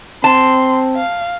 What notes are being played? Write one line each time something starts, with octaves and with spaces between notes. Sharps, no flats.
C4 A5 C6
F5